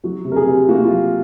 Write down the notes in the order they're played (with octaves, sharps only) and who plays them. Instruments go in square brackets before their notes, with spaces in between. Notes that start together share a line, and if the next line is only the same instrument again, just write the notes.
[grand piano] F#3 F#4
C3
A#4
G#4
C3
A#3 F#4
F4
F#3